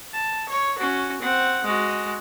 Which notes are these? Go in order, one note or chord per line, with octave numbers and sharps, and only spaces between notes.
A5
C#5
C#4 F#4
C4 F#5
G#3 F#4